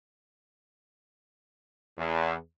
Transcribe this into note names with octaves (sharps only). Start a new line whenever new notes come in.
E2